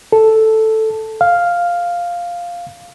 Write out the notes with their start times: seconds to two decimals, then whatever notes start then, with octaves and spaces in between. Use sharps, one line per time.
0.12 A4
1.21 F5